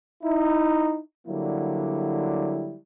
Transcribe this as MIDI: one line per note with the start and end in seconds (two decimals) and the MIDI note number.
0.24 0.99 63
0.24 0.99 64
1.27 2.77 50
1.27 2.77 54
1.27 2.77 55
1.27 2.77 58
1.27 2.77 64